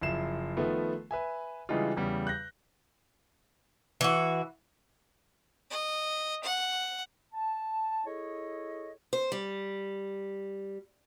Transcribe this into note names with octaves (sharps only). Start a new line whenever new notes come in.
F#1 F3 E4 C7 E7
D#3 F3 A3 B3
B4 E5 G#5
C#3 E3 G3 G#3 D#4 F4
E2 C#3 G3
F#6 G6 A#6
E3 F#4
D#5
F#5
A5
E4 G#4 A4 C#5 D#5
C5
G3